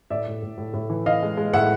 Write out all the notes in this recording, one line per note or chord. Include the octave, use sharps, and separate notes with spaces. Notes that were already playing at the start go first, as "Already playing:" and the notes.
A2 D5 E5
A2
A2
A2
A2
E3
E3 D#5 F5
G#3
G#3
A2 E5 F#5